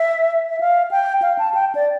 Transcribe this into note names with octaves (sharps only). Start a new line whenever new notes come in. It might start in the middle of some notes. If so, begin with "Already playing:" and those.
Already playing: E5
E5
F5
G5
F5
A5
G5
D5